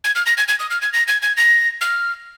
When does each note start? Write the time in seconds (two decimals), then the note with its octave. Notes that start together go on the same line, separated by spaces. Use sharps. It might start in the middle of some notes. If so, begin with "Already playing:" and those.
0.04 G#6
0.15 F6
0.26 A#6
0.38 G#6
0.48 G#6
0.59 D#6
0.71 F6
0.82 G#6
0.93 A#6
1.08 G#6
1.22 G#6
1.37 A#6
1.81 F6